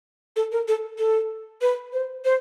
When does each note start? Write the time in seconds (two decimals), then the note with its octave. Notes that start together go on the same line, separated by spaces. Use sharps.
0.36 A4
0.52 A#4
0.68 A4
0.99 A4
1.62 B4
1.93 C5
2.25 C5